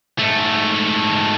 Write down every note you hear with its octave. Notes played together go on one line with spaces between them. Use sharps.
G#2 A3